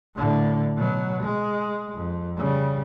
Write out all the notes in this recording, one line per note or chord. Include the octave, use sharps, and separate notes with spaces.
A2 D3
B2 F#3
G#3
F2
C#3 G3